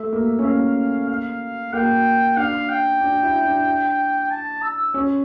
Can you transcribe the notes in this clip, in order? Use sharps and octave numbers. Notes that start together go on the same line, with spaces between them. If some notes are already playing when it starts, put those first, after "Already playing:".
Already playing: A3 E5
A#3
C#4
A#3 F5
F5
A#3 G5
D4 F5
G5
D4
E4
D4
A5
E6
C#4